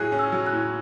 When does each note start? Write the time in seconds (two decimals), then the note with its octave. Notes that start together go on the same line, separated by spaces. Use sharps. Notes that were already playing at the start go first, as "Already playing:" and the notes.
Already playing: A2 F#3 G#4 F#6
0.12 C#4
0.19 E6
0.32 F#3
0.46 F#6
0.52 A2